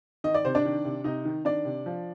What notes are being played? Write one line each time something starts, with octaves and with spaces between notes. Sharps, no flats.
D#3 D#5
D5
C3 C5
D4 D5
D#3
C3
C3 D#4 D#5
D#3
D#3 D4 D5
C3
F3